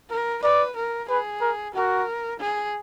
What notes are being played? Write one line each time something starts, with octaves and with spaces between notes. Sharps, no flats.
A#4
B4 D5
A#4
G#4 B4
A#4
F#4 A#4
G#4